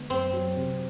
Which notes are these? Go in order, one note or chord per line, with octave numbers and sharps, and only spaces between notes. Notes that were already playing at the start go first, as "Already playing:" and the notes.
Already playing: D3 G#3 B3
F#2 C4
F#3
C3